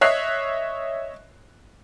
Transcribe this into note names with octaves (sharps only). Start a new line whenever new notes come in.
C#5 D#5 E5 F#6 C7 F7